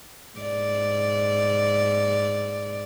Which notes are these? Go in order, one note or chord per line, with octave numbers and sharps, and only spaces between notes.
G#2 D5